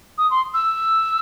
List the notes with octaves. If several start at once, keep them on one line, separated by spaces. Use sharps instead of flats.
D#6
C6
E6